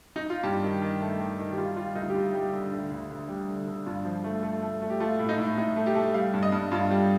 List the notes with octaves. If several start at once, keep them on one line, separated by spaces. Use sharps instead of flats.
D#4
F4
G2 G4
D#3
D#3
A3
D#3
D#3
G4
G3 F4
G3 F4
D2 D#4
G4
G3 F4
G3
D3
D2
D2
D2
G3
D3
D3
G2 F4
F3
A3
A3
A3
A3
G4
A3 F4
A2
D#4
A2
A2 D#4
A3
G4
A3
G3 F5
G2
D#5
G2
G2 F4
G3